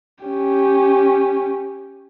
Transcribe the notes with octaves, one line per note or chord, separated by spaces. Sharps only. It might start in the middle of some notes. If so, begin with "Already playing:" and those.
C#4 G4